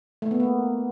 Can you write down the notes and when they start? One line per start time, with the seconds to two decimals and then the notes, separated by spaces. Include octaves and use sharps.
0.22 A3
0.31 B3
0.40 A#3